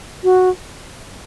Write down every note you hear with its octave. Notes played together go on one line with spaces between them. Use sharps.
F#4